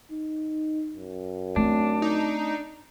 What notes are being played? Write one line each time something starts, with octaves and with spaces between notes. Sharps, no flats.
D#4
F#2
A3 C4 D4
D#4